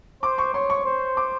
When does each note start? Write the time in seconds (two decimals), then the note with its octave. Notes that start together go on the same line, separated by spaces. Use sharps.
0.23 C5 D6
0.38 C#6
0.54 C#5 C6
0.70 C#6
0.85 C5
1.17 D6